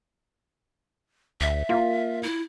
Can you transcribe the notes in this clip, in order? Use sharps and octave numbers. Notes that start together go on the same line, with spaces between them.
D2 E5
A#3 F4
E4